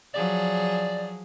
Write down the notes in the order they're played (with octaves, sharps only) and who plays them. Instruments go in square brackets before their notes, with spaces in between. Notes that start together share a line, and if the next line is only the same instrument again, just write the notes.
[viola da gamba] F3 F#3 G#4 [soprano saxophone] D5